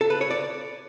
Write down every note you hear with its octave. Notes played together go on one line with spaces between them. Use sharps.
A4
B4
C#5
D5